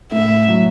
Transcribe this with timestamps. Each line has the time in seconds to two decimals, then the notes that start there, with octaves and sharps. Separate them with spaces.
0.12 A2 E5
0.48 F#3